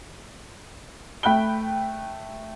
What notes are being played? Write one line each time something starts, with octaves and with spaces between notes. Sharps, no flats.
A3 G5 B5 F#6 G7